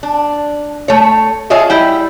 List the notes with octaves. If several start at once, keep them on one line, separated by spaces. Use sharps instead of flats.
D4
A3 C#5
F4 G#4 C#5 D#5 E5
G3 E4 G5